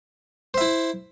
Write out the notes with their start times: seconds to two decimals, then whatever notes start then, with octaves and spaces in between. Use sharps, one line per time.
0.54 C5
0.58 E5
0.61 E4